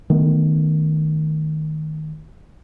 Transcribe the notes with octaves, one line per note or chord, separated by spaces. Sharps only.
D#3 A3 B3